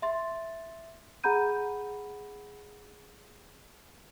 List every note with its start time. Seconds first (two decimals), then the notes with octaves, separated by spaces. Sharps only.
0.02 E5 C6 A6
1.24 G#4 F#5 A#5 B5 G6 D#7